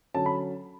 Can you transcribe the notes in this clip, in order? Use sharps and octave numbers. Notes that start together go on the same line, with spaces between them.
D3 F#3 C#4 A5
B5